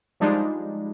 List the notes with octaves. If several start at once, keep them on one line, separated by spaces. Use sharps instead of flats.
F3 G3 G#3 D4 D#4